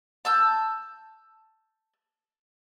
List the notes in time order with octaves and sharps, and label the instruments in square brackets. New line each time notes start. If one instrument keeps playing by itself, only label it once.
[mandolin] A5 E6 G6